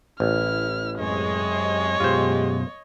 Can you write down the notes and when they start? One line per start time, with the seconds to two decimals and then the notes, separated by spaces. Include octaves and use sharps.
0.20 A1 E4 F6
0.99 F#2 C3 G#3 C#5 D#5
2.00 F#2 B2 G#3 F4 G4 C5